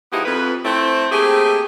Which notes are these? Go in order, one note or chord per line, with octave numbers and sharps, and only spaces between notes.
F3 G#3 B3 D#4 E4 G4
F2 B4
A3 C4 E4
A3 A#3 C4 G4 G#4